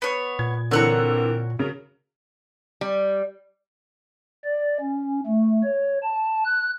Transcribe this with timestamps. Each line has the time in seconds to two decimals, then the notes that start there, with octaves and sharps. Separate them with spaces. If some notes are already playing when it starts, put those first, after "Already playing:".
0.02 B3 C#5
0.39 A#2 G#6
0.71 D3 E3 C4 A#4 C#5 F#5 A#5
1.59 C#3 F#3 A#4
2.81 G3
4.45 D5
4.80 C#4
5.26 A3
5.64 C#5
6.03 A5
6.45 F#6